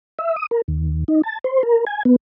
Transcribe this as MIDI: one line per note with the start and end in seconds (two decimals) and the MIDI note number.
0.19 0.36 76
0.36 0.46 87
0.51 0.61 70
0.68 1.04 39
1.08 1.22 63
1.23 1.39 81
1.44 1.63 72
1.63 1.85 70
1.87 2.03 80
2.05 2.16 59